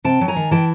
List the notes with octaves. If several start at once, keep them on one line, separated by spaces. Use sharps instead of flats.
C3 G5 A5
F#3
G#5 A#5
D#3
E3 G5 A5